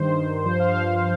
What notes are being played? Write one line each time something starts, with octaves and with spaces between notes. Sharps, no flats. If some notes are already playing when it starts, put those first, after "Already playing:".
Already playing: G2 D#3 C5
G2 F3 C5
F5